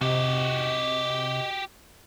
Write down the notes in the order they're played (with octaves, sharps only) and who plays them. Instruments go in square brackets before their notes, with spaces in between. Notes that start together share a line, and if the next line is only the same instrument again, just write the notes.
[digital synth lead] C3 [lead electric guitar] F#4 G4 [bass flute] D#5